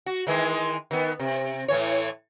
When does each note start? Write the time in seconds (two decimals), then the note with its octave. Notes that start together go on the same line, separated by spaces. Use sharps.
0.06 F#4
0.27 D#3 E3 G#3
0.91 D#3 B3
1.19 C3
1.68 A2 E3 C#5